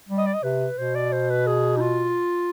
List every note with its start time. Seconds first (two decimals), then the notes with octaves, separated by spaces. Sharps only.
0.08 G3
0.18 D#5
0.26 D5
0.34 D#5
0.43 C3 B4
0.78 B2 C5
0.95 D5
1.12 C5
1.30 B4
1.47 G#4
1.77 D#4
1.81 F4